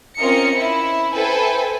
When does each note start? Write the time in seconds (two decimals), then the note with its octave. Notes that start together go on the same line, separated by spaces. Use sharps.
0.19 C4 C#4 F4 A#4 D#5 C#7
0.54 E4
1.13 E4 A4 B4 C5 G5 G#5